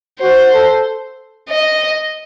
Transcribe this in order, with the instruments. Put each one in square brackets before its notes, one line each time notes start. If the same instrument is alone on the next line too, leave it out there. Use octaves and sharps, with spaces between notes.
[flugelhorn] F#4 [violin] C5
[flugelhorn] A4
[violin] D#5